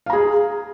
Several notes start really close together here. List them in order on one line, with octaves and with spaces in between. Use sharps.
F5 A#5 G#4